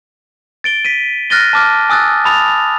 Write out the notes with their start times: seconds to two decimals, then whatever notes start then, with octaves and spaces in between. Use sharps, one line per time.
0.64 A6 D7 G7
0.85 B6 D#7
1.30 F6 F#6 A6 A#6 D#7 G7
1.53 A5 D6 F6
1.90 G#5 D#6 E6 F#6 A6
2.25 A5 B5 D#6 A6 F7